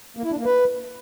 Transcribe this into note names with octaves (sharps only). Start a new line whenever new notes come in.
A#3
E4
D4
A#3
B4